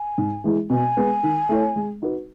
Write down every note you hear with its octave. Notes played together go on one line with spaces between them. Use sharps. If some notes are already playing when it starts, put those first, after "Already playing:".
Already playing: G#5
G#2
E3 G#3
B2 G#5
G#3 B3
D#3
A3 E4 A4 C#5
G#3
D#4 F#4 B4